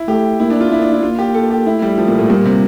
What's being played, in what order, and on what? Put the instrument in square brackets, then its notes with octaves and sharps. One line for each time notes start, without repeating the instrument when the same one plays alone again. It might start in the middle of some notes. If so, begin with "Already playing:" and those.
Already playing: [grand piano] E4
[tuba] A3 [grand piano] G4
[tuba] A#3 [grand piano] E4
[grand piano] D4
F4
[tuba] A#3 [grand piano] E4
[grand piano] D4
E4
[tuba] A#3 [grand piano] F4
[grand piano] G4
A4
G4
[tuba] A3 [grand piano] E4
[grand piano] G3
F3
A#2
A2
[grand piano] A#2 [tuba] G3
[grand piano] C3